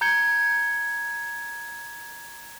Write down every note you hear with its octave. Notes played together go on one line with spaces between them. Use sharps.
A#5 G6 G#6 C#7 G7